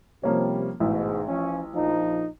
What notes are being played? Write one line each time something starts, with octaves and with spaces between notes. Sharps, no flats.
C3 F3 G3 A#3 C#4
A1 G#2 B2
F3 C#4
A#1 F3 D#4